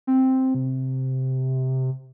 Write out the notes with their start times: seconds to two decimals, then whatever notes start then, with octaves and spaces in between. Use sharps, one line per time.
0.07 C4
0.55 C3